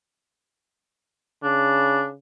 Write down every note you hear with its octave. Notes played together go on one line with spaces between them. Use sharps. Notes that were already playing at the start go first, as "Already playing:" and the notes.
C#3 D4